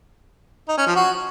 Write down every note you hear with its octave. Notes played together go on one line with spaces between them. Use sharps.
D#4
C#4
F3
F#4